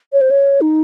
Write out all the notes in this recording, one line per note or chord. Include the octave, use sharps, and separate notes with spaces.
C#5
C5
C#5
D#4